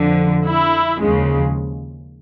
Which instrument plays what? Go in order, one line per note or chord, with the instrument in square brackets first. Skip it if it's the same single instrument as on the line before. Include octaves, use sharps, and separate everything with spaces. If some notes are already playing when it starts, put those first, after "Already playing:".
Already playing: [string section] F2 D3 F3
E4
D#2 C#3 F3 G#3